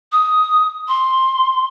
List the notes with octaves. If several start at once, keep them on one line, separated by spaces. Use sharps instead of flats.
D#6
C6